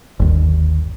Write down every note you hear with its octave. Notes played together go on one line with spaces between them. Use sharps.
G1 D#2